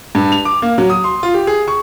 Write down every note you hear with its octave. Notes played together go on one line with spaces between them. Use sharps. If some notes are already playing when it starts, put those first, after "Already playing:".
G2
F7
D6
A#3
F#3
D#6
C6
F4
G4
G#4
C#6